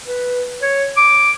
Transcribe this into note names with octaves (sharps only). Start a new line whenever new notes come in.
B4
C#5
D6